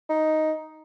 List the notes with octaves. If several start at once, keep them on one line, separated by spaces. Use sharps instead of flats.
D#4